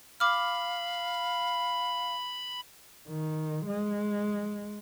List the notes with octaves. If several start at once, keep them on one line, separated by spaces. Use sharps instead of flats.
F5 B5 D6 F6
D#3
G#3